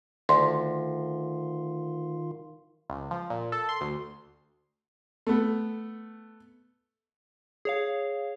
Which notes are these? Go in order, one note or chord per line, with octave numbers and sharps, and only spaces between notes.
D2 D#3 F4 C6
C#2
F3
A#2
A4
C6
D2
A3 B3
G#4 C#5 F5